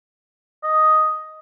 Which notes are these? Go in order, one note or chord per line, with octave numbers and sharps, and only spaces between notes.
D#5